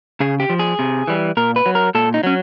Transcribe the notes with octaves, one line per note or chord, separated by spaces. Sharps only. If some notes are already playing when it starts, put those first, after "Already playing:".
C#3 G#4
G4
F3
G#4
C3
E3 G3
A#2 A#4
B4
F#3
A#4
A#2 A4
D#4
F#3 C#4